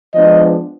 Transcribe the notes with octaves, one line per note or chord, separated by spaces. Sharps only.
F3 G#3 B3 D4 D#5